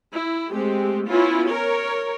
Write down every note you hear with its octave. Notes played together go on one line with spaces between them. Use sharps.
E4
G#3 A3 C4 G4
B3 C#4 E4 F4
A#4 C#5